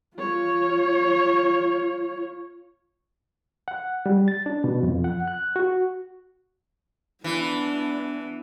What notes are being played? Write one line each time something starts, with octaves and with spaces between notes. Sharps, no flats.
F4 C#5
F#5
G3
A6
D4
B2
F2
F#5
F#6
F#4
E3 B3 D4